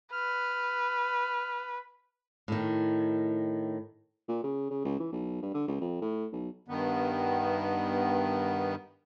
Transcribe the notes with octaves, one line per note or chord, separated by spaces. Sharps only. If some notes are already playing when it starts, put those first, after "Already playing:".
B4 F6
A2 D#3
A#2
C#3
C#3
C#2
E3
B1
G2
D3
C#2
F2
A2
B1
G2 D#3 B3